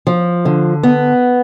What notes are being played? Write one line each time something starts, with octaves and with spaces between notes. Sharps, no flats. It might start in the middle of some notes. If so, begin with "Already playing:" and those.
F3
D3
B3